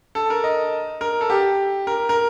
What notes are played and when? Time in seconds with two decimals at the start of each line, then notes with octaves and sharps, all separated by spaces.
0.15 A4
0.30 A#4
0.44 D#5
1.01 A#4
1.21 A4
1.30 G4
1.87 A#4
2.09 A#4